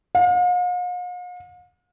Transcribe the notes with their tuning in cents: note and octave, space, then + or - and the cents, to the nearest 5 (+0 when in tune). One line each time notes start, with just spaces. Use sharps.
F5 +45